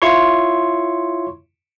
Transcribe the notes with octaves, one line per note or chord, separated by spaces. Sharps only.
E4 F4 C#5 C6 C#6